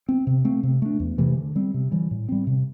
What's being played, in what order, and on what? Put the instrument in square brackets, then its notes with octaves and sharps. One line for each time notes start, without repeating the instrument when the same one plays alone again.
[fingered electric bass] C4
C3
A3 C4
C3
A3 D4
E2
C3 E3 A3
D3
G3 C4
C3
E3 G3
A2
G3 C4
C3